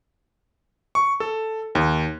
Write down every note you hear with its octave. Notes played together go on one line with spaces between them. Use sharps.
C#6
A4
D#2